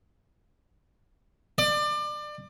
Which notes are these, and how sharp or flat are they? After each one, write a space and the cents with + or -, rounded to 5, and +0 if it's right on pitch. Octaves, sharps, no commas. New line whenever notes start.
D5 +30